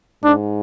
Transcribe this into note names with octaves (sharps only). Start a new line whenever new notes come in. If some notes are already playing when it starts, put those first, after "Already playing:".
G#2 D4